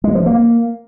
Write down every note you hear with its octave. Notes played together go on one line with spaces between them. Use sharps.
G#3
F3
A#3